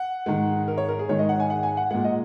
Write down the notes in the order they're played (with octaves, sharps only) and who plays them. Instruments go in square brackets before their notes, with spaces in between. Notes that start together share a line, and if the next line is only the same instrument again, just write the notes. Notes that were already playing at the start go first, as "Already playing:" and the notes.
Already playing: [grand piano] F#5
G#2 D#3 G#3
A#4
C#5
A#4
G#4
G#2 D#3 G#3 C#5
D#5
F#5
G#5
F#5
G#5
F#5
A#2 G#3 F#5
D#5